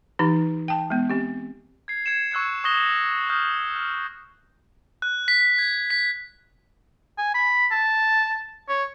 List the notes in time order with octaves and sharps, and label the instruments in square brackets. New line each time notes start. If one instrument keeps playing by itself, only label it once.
[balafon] E3 D#4 G4
G5 A5
G#3 B3
C4 G4
[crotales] G#6 C7
G#6 C#7 E7
C#6 E6 F#6 G#6 C#7
C#6 D#6 F#6 A#6 G7
D#6 F6 G6
F6
F#6
B6
G#6
B6
[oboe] G#5
B5
A5
C#5